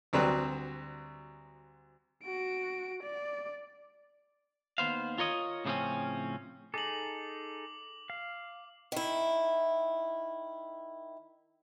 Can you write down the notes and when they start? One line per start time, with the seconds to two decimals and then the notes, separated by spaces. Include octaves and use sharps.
0.13 D2 F#3 G3 C4 B4
2.23 F#4 D7
3.03 D5
4.78 D#2 B3 C5 F5
5.18 F4 A#4 C#5 D#5
5.65 A2 C#3 F3 A#3 C4 C#4
6.74 D#4 G#4 A4 D6 F#7
8.10 F5
8.92 D#3 E4